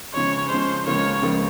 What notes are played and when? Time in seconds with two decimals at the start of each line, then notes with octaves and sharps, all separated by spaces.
0.13 C#3 F3 G#3 C#5
0.49 C#3 F3 G#3 C5
0.86 C#2 C#3 F3 A#3 F4 C#5
1.22 C#2 C#3 F3 A#3 F4